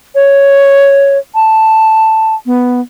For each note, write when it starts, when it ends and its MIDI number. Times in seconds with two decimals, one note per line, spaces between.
0.15 1.18 73
1.35 2.35 81
2.46 2.80 59